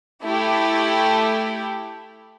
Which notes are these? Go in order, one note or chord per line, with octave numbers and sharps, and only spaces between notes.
A3 E4 G4